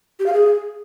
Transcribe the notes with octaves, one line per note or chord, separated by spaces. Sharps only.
G4
F5
G#4